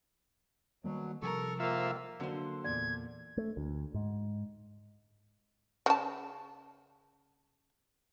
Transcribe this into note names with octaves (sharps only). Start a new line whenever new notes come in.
B2 D#3 F#3 G3 A#3
C3 F3 G3 A4 A#4 C#6
F2 G#2 A#3 C4 F4 E5
D3 F#3 A#3 D4 C5
E2 A#2 D5 G#6
A3
D2
G#2
C#3 A5